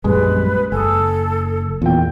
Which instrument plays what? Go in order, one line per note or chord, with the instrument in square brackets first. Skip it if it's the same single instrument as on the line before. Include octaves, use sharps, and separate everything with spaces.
[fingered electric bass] A#1 F#2 G3 [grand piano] G#3 [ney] B4
[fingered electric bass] F#1 [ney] A4 [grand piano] G#5 D#6
[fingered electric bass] E2 [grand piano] A#2 G5